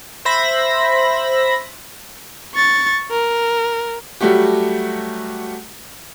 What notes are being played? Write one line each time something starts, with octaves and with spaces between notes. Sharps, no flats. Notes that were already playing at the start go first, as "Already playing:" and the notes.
C5 E5 B5 A#6
C#6 A6
A#4
F#3 G3 A3 F#4 G4